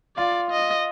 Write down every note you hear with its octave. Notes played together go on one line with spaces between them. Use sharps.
F4 D5 F5
D#5